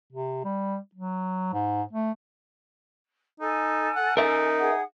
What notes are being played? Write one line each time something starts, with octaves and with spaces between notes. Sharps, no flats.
C3
G3
F#3
G#2
A3
D#4 A4 G#5
F#5
D#4 A#4 E5
G#4 F#5 D#6